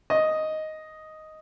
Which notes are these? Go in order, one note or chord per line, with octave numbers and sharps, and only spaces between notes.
D#5